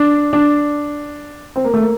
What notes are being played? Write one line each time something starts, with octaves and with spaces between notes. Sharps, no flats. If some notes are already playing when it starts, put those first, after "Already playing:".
Already playing: D4
D4
C4
A#3
A3
A#3